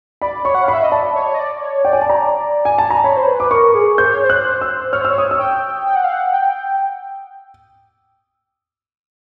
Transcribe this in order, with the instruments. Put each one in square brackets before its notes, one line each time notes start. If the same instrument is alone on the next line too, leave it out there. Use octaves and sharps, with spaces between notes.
[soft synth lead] D5 [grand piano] B5
[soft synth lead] C#5 [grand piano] C#6
[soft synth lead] F#5
[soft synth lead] F5 [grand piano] B5
[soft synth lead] E5
D#5
[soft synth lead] D5 [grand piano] A5
[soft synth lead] C#5
D#5
D5
C#5
[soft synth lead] D5 [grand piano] G5
[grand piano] G#5
A5
A#5
G#5
A5
A#5
[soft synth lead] C#5 [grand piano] B5
[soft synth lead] C5
B4
[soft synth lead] B4 [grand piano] D6
[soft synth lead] A#4 [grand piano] C#6
[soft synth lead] G#4
[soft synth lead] C5 [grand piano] G6
[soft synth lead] C#5
C5
[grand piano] F#6
[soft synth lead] C5
[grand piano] E6
[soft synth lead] C#5 [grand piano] F6
[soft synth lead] C5 [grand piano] E6
[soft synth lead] C#5
[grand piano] D#6
E6
[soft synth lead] G5
G5
F#5
F5
F#5
G5